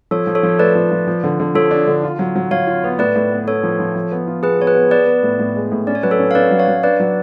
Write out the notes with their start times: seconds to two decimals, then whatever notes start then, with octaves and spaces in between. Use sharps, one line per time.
0.11 F3 A4 C#5
0.27 F3
0.35 A4 C#5
0.43 F3
0.59 A3 B4 D5
0.75 F3
0.91 F3
1.07 F3
1.24 D3
1.40 D3
1.55 F3 A4 C#5
1.71 D4
1.87 D3
2.03 F4
2.19 F#3
2.36 F#3
2.51 F#3 C#5 F5
2.67 F4
2.84 B3
2.99 A2 B4 D5
3.16 A2
3.31 B3
3.47 B3 A4 C#5
3.63 F3
3.80 F3
3.95 F3
4.11 B3
4.27 F4
4.43 B3 G#4 B4
4.59 B3 C#5
4.67 G#4 B4
4.75 B3
4.91 B3 B4 D5
5.07 B3
5.23 A2
5.39 A2
5.56 G#3
5.72 A2
5.87 C#4 D5
5.95 C#5
6.03 F#3 B4
6.11 A4 C#5
6.19 C#4
6.31 F5
6.35 C#4 B4 D5
6.51 F#3
6.59 C#5 F5
6.68 F#3
6.83 D4 B4 D5
7.00 F#3